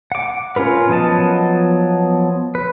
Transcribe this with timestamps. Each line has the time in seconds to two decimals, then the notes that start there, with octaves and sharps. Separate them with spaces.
0.12 F#5 D6
0.56 C#4 F4 A#4 B4
0.89 F3 F#3 B3 D#5 A5
2.55 B4